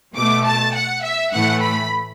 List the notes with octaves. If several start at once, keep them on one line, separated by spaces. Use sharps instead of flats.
B2 A3 D6
A5
F#5
E5
A2 E3 A3 F#5
B5